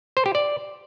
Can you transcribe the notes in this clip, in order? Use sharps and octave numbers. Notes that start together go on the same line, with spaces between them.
C5
G4
D5